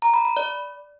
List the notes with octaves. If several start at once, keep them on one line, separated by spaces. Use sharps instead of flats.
A#5
B5
B5
D5